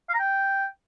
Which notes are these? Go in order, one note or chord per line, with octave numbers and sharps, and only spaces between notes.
F5
A#5
G5